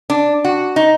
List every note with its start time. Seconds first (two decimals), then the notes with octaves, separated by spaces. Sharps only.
0.10 D4
0.44 F#4
0.76 D#4